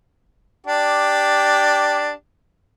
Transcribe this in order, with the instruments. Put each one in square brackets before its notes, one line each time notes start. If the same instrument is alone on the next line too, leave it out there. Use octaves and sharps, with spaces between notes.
[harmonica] D4 G4